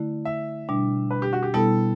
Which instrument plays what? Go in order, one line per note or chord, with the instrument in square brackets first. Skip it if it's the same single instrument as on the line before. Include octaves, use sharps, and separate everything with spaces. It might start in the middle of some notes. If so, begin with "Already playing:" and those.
Already playing: [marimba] D3 A3 E4
[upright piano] E5
[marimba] B2 G3 D4
[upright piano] B4
G4
F#4
G4
[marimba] B2 G3 B3 E4 [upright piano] A4